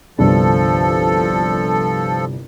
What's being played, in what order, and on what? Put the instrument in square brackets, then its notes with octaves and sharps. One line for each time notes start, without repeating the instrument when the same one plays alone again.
[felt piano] G1 C2 D4 [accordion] F3 A4